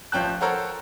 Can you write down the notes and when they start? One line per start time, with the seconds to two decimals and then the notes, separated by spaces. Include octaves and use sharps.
0.12 A1 F3 C#4 G5 A5 F#6
0.41 A4 A#4 C5 C#5 F#5